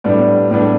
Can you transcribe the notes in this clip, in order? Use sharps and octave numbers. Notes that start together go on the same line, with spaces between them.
A2 G3 B3 D4
A2 G3 B3 D4